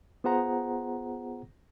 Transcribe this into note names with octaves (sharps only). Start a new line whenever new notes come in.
B3 F4 G#4 C5 F#5 A#5